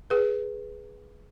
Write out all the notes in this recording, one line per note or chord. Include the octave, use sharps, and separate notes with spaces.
G#4 B4